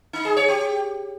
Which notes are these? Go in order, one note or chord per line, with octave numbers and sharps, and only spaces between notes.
D#4
G#4
C#5
G4